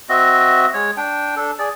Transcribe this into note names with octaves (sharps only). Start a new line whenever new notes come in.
C4 F#4 D#5 E5
G#3 C#5
D4 G5
D4 A4
G#4 D5